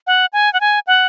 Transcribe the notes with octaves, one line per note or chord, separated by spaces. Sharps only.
F#5
G#5
F#5
G#5
F#5